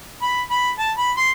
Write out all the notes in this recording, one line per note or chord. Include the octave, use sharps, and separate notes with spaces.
B5
B5
A5
B5
C6